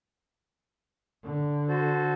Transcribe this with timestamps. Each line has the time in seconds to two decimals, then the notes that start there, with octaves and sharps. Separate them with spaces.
1.24 D3
1.69 F#4 A4 C5